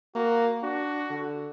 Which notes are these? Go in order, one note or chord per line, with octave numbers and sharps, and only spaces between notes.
A#3 F#4
D4 F#4
D3